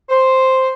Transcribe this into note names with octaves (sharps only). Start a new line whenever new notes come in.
C5